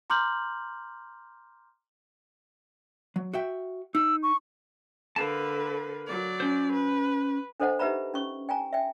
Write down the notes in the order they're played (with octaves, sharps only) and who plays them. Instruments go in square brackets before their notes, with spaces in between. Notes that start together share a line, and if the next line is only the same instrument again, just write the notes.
[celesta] A#5 C6 D6 F6 G6 F#7
[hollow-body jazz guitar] F#3
F#4 E5 G5
[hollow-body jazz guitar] D#4 [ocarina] E6
[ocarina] C#6
[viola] D3 B4 [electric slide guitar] A#4 F5 A5
[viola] F#3 D5
[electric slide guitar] C#4 C5
[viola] B4
[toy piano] D4 A4 C5 D#5 F#5 A5
D#4 G4 B4 E5 A#5 B5
C#4 C#6
G5 G#5 A#5
E5 G5